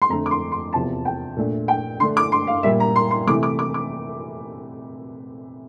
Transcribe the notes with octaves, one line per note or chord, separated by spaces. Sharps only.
C6
F2 D3 A3 A#5
D6
C6
C6
E2 C3 F3 A5
G5
A#2 A3 D4
G5
D3 A3 D4 C6
D6
C6
F5
A#2 G3 A#3 E5
A#5
C6
C6
C3 E3 A3 D6
D6
D6
D6